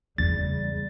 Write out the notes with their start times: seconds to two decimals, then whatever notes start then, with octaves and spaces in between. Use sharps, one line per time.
0.18 E2 C#3 G3 A6